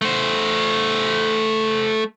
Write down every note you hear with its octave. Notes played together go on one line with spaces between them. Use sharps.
A3 C5